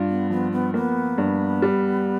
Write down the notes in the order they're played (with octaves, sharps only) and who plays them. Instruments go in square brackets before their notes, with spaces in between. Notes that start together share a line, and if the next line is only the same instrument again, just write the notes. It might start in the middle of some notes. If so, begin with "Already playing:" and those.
Already playing: [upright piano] G2 F4
[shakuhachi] B3
[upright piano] F3 [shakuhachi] B3
[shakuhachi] B3
[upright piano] A#3 [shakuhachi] B3
[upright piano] G2
G3